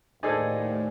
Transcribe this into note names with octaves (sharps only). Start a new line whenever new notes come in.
D#2 A2 D#4 G#4 A4 C5 D5 G#5